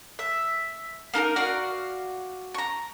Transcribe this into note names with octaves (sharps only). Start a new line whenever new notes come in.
E5
A#3 D#4 A4 A#4
F#4 D5 F5
A#5 C#6